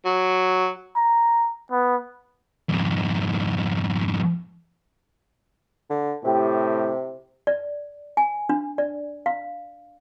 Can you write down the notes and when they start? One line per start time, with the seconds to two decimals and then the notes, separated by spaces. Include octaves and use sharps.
0.06 F#3
0.96 A#5
1.72 B3
2.69 F2 G#2
5.90 D3
6.24 A2 C3 G4
7.47 D5
8.17 G#5
8.49 D4
8.78 D5
9.26 F5